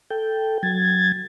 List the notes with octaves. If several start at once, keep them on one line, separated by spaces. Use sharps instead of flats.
A4 G5
F#3 G#6 A6